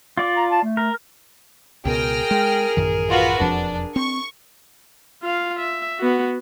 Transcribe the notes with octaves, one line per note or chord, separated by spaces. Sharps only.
F4 D5
A#5
A5
A3
A#4
C#2 B2 G#4 A#4 G5 F6 A#6
G#3
A1 F#2 D#3
F4 F#4 B4
E1 F2 F3 D4
C4 C#6
F4 F5
E5
B3 F#4